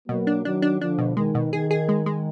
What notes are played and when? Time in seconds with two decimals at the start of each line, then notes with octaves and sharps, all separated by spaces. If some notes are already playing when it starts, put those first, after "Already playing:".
0.09 B2 F#3 A#3
0.27 D4
0.45 D#3 F#3 D4
0.62 D4
0.81 D3 F3 D4
0.98 B2
1.17 D#3 G#3
1.35 B2
1.53 D#3 G#4
1.71 G#4
1.89 G#3
2.06 G#3